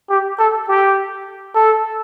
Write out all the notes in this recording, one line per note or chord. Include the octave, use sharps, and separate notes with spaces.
G4
A4
G4
A4